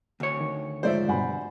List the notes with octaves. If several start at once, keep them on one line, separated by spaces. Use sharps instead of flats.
D2 C#5
D#3
G#2 F3 C5 D5 E5
G2 B2 F#5 G#5 B5